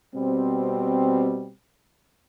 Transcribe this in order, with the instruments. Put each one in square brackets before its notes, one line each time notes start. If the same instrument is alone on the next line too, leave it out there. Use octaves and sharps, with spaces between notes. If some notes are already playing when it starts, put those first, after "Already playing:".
[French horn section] B2 G3 C4